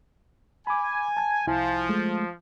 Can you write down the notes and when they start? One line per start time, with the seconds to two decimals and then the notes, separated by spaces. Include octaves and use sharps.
0.67 G#5 B5 D6
1.17 A5 G#6
1.47 C2 F3 E4 G#5
1.89 G#3 A3